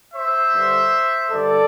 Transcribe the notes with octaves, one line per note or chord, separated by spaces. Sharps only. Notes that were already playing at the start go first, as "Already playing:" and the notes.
C5 E5
G2 D3
G2 D3 A4 D5